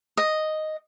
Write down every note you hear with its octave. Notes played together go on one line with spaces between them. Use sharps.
D#5